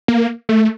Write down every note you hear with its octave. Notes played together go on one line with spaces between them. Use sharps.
A#3
A3